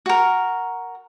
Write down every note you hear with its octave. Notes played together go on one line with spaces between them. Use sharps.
F#4 A#4